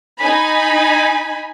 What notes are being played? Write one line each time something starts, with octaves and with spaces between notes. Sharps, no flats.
D#4 G#5 B5